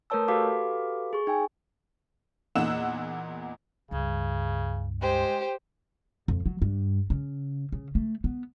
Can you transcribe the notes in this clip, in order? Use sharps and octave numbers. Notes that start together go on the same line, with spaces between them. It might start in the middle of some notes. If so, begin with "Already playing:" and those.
A3 A#4 B4 C#5 A5 E6
F#4 G4 A4 B4 F5 D6
G#4 C#6
D#4 G5 G#5
E2 A#2 D#4 F#5 E6 E7
C#2 G2 C#3
G#3 G4 C5
F2
F#3
G2
C#3
C#3
A3
B3